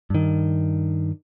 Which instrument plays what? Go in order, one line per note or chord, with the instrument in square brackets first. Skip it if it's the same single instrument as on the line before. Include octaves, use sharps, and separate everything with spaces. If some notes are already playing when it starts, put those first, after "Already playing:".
[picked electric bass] G2 D#3